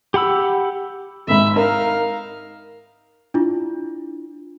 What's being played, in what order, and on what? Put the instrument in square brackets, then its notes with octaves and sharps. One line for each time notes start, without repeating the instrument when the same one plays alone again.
[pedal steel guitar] G4 F#5 B5 E6
[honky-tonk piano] G#1 G#2 [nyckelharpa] E5 B5
[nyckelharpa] D#4 F5 [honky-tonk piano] A#4
[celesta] D4 E4 F4